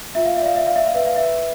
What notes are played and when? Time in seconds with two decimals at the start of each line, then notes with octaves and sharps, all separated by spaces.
0.15 F4 E5
0.25 F5
0.36 E5
0.41 D5 F5
0.56 E5
0.66 D5 F5
0.76 E5
0.87 F5
0.94 B4 E5
1.06 F5
1.16 B4 E5